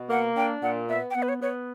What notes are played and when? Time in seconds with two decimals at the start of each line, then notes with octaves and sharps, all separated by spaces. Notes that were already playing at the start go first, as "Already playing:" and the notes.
Already playing: B2
0.10 A#3 F#5
0.36 D4 G5
0.62 A#2 F#5
0.89 B3 E5
1.10 G5
1.15 B3 F#5
1.23 B4
1.29 C#5
1.42 B3 C#5